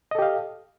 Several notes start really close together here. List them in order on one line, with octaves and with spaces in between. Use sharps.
D#5 A4 G4 F5